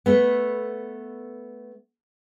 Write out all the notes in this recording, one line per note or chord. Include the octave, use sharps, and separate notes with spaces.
A3 B3